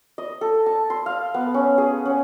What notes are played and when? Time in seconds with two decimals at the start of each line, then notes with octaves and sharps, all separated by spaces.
0.18 D#5
0.41 A4
0.66 A5
0.90 C6
1.06 F5
1.34 B3
1.54 C#4
1.78 G#4
2.05 C#4